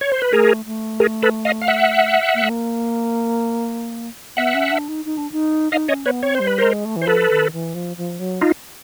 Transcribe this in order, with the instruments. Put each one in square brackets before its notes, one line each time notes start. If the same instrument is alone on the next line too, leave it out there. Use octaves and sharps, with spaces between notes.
[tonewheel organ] C#5
C5
B4
[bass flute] A3 [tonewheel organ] G#4 A#4
[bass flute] A3
[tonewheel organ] G#4 A#4
A4 B4
D#5 F5
F5
E5 F#5
[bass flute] A#3
A3
A#3
[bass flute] B3 [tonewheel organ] E5 F#5
[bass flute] C#4
D4
D#4
D#4
D4
D#4
[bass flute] D#4 [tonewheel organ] D#5 F5
[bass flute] C#4 [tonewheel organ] C#5 D#5
[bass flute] B3 [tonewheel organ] B4 C#5
[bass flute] C4 [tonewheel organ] C#5
[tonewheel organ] C5
[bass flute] G3
[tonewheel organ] B4
[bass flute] G#3 [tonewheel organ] A#4 C5
[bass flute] A3
E3
[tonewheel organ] C5
[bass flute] F3 [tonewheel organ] A4 B4
[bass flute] D#3
E3
F3
F3
F#3
[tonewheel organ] D#4 F4